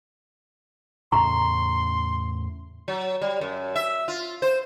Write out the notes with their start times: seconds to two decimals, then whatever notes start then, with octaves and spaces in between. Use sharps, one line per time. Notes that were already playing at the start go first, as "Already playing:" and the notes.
1.12 E2 A2 C#3 A#5 C6 C#6
2.88 F#3
3.21 G3
3.41 F#2
3.75 E5
4.08 F4
4.42 C5